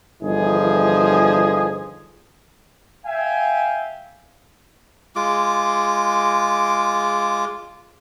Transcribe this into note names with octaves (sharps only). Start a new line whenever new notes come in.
G1 E3 F3 D#4 G#4
E5 F5 G5 G#5
G#3 F4 D6